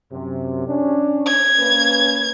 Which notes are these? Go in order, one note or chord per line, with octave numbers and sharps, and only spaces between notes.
F#2 C3
C#4 D4
G#6
A#3 C#4 B4